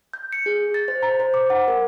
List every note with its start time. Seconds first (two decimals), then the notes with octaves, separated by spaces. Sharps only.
0.13 G6
0.32 C#7
0.46 G#4
0.74 A6
0.88 C5
1.03 A#5
1.20 C5
1.34 D6
1.50 F#5
1.68 A#4